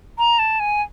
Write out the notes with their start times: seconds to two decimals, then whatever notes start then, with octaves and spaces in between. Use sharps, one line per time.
0.18 A#5
0.39 A5
0.60 G#5